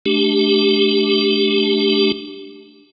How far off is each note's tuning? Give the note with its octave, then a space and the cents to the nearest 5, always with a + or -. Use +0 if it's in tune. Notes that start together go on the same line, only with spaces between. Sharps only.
A3 -30 D4 +0 G4 +0